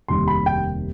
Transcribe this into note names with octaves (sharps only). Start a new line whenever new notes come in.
F1 D#2 D#3 G3 C6
B5
G5